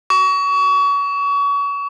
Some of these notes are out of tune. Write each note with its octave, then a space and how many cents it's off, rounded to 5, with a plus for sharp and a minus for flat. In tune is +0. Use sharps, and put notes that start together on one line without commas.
C#6 +35